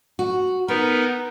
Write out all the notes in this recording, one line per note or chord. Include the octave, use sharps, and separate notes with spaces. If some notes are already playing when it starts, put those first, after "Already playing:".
F#4
B3 D#4 A#4 B4